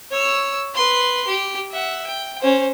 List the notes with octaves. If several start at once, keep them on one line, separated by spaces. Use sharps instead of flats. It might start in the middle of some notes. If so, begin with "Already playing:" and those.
C#5 E6
B4 C6
G4
E5 F#5
G5
C#4 C5